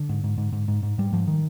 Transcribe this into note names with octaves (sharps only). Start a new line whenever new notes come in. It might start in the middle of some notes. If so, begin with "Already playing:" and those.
Already playing: D3
G#2
G#2
G#2
G#2
G#2
G#2
G#2 G3
G#2 F3
D#3